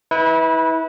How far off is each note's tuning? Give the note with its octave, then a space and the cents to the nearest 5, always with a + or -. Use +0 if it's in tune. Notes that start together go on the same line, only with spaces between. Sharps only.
E4 -30 B4 -5